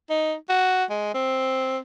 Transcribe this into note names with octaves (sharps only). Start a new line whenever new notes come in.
D#4
F#4
G#3
C4